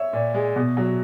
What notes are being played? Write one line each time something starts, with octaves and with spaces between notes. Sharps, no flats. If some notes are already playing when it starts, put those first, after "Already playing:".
Already playing: C#5 E5
A#2
G#3
B2
F#3